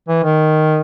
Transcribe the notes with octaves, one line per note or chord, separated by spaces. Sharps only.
E3
D#3